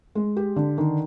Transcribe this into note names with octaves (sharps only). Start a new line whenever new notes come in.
G#3
G4
D3
D#3